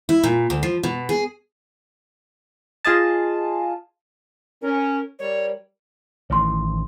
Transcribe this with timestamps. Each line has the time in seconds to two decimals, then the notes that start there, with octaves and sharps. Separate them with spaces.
0.09 E4
0.23 A#2
0.50 D2
0.63 F3
0.83 B2
1.09 G#4
2.85 F4 G#4 D#5 A5
4.62 C#4 A#4
5.19 G3 A#4 C#5 D5
6.30 A1 A2 D#3 C#5 C6